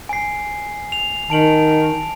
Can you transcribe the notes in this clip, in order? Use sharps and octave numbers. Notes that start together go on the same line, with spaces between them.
G#5 C7
F7
D#3 A5 D7 F#7